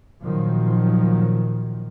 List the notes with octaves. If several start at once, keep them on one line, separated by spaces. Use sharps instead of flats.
A#2 D#3 F3 F#3